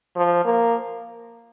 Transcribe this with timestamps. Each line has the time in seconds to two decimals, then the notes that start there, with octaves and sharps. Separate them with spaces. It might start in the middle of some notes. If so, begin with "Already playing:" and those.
0.16 F3
0.45 A#3